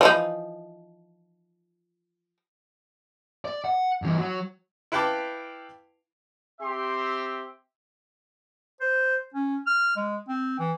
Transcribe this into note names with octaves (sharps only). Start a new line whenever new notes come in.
E3 F3 D#4
D5
F#5
G2 E3
F#3
E4 B4 F5 G5 A5 D6
C4 G4 E5 C6
C5
C#4
F6
G#3
C4
E3